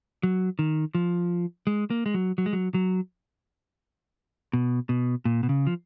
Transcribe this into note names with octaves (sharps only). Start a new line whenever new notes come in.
F#3
D#3
F3
G#3
A#3
G#3
F#3
F#3
G#3
F#3
F#3
B2
B2
A#2
B2
C#3
F3